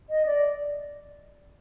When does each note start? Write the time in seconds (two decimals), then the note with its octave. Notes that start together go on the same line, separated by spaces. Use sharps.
0.10 D#5
0.26 D5